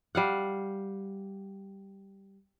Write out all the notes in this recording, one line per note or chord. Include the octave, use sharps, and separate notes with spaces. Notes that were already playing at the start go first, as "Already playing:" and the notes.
G3 F5 F#5